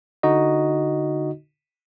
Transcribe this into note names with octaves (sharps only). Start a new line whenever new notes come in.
D3 D#4 F#4 D#5